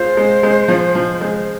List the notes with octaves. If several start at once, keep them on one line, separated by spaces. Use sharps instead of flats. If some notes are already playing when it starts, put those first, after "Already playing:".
Already playing: G#3 F4 C5
G#3
G#3
F3
F3
G#3